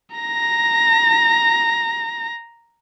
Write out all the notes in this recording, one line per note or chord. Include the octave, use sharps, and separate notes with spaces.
A#5 A#6